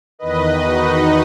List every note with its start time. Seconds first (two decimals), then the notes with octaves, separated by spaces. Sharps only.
0.19 E2 D#3 B4 D#5
0.62 D#4 F#4